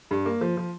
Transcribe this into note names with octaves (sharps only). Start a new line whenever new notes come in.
G2
A#3
F3
F3